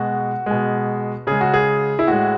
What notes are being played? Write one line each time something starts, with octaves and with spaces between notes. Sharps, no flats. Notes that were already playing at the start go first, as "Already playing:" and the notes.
Already playing: B2 G#3 F#4
B2 G#3
C#3 G#3 G#4
F#4
G#4
E4
A2 G#3 F#4